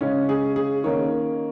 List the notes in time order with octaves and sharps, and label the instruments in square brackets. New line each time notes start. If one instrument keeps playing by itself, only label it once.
[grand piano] C#3 G#3 C#4 C#5
G#4
G#4
D#3 A#3 C#4 C#5